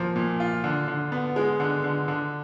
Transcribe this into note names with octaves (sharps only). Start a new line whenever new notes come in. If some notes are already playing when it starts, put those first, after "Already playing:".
Already playing: A#2 F3 A#3
A#2
F4
D3
D3
B3
G#3
D3
D3
D3